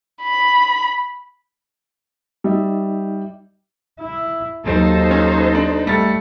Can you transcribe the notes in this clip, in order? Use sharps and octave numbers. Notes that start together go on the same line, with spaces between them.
B5
G3 D#4 D#5 E5
E4
D#2 F#3 D#4 A4 C5
C#4
D4
G3 A3 A6 C#7